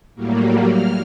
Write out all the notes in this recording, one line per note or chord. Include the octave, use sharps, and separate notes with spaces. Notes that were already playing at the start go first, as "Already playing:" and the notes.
A2 F#3 G3 A#3
F6